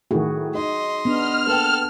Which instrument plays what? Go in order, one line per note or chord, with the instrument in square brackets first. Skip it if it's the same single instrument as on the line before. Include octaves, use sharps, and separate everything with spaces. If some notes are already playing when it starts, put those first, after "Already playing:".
[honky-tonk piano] A2 D#3 [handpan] F#4 G#4
[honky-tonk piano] D#4 [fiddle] D#5 C6
[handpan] B3 D4 [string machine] F6
[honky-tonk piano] A#3 B4 G5 [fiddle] A4